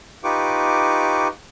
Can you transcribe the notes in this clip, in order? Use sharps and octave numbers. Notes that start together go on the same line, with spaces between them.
D#4 F4 G4 B4 C#6 D6